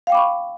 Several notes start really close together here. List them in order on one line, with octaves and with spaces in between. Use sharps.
F5 G5 D6 B5 C#6